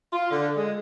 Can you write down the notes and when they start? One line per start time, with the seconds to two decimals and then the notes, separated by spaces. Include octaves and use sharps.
0.13 F4
0.31 D3
0.56 G#3